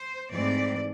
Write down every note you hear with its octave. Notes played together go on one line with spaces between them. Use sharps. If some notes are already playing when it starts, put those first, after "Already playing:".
Already playing: C5
G#2 E3 A3 C4 D5